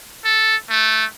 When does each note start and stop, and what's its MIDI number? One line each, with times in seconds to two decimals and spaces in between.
0.24 0.56 69
0.70 1.05 57